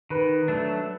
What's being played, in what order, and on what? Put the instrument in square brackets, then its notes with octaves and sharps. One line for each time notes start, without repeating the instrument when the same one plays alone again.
[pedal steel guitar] D#3 [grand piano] B4
[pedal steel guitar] F#3 A3 D4